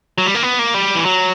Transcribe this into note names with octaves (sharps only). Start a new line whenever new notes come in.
F#3
G3
A#3
B3
A#3
G3
E3
F#3